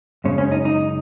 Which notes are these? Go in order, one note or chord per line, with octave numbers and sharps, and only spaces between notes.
F#2 C#3 G#3 C#4
C#4
D#4
D#4